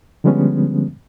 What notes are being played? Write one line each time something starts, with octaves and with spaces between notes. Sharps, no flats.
D3 F3 G3 G#3 B3 C#4